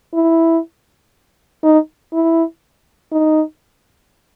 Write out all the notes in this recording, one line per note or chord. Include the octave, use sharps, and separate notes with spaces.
E4
D#4
E4
D#4